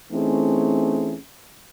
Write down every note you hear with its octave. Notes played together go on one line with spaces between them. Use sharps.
E3 A3 C4 C#4 D#4 G#4